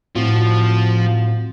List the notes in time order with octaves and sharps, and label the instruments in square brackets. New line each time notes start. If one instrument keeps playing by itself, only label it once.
[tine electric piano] A2 C4 F#4 [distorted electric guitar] F3